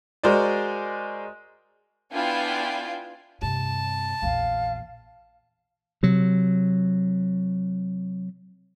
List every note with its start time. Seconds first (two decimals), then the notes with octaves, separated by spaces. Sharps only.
0.23 G#3 F#4 A#4 C5 D5
2.12 B3 D4 E4 F4 G5 G#5
3.42 G2 C3 A5
4.22 A#1 E2 F5
6.03 C3 F#3